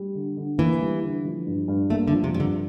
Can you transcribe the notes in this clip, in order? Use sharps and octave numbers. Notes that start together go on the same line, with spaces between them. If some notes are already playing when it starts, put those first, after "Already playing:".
Already playing: G3
D3
D3
E3 A#3
G3
D3
F3
G2
G2
A3 A#3
D3
F3
C3
G2 C3
D3